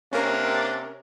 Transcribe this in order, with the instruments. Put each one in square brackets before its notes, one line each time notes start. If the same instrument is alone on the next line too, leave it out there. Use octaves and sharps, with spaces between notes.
[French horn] C3 [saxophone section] A#3 [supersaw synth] C#4 A#4 [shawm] D4